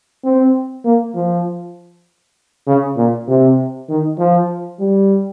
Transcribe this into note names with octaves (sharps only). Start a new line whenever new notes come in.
C4
A#3
F3
C#3
A#2
C3
D#3
F3
G3